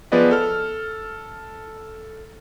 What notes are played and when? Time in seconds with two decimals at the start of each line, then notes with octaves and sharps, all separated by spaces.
0.12 F3 B3 G#4 B4 D5 D#5
0.31 A4 F6